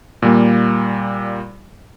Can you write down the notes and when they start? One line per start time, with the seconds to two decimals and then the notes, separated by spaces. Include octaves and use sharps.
0.22 A#2 G3 A#3